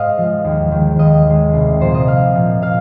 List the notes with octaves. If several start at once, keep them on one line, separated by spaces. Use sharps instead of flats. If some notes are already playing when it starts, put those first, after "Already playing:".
Already playing: G#2 C5 D#5 F5
F3 G#3
D#2
D#3 G#3
D#2 D#5
D#3 G#3
C2
A#2 F3 A#3 C5
D#5
C2 F5
A#2 F3 A#3
A#2 F5